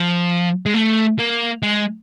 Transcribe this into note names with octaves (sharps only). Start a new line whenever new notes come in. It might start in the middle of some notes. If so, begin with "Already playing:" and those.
Already playing: F3
G#3
A3
A#3
G#3